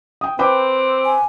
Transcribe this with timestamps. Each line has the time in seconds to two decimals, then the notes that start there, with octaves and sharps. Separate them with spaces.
0.21 G5 D#6
0.39 C4 B4 G5 D6
1.05 G#5